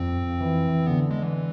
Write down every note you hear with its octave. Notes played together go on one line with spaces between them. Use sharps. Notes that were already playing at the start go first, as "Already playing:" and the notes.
Already playing: F2 C4
E3
D3 B3
G#3
E3